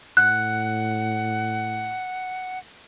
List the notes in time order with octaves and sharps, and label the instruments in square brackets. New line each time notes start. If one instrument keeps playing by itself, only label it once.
[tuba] A2 [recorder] F#5 [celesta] F#6